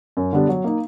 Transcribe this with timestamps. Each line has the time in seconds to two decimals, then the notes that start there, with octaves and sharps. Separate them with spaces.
0.17 F#2
0.33 D3 G3 B3 D4
0.49 F#3
0.64 A#3 D#4